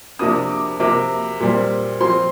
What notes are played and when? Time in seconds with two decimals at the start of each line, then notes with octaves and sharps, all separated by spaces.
0.19 C3 F3 A#3 D4 D#6
0.50 D6
0.80 C3 F3 A#3 D6
1.40 A#2 G3 C4
2.01 F3 C4 C6